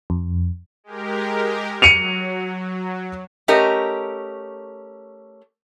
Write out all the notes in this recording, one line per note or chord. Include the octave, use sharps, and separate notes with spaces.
F2
G#3 G4 A#4
F#3 C#7 D#7 F7
A3 C#4 G4 A#4 D#5